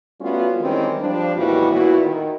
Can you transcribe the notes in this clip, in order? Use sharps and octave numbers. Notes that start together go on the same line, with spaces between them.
G3 A3 B3 C#4 F4 F#4
D#3 E3 G3 G#3 C4 C#4
F3 G3 D4
D#2 A2 E3 G3 B3 F#4
A#2 B3 E4 F#4
D#3